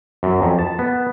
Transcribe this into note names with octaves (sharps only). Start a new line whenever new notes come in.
F#2
F2
A5
B3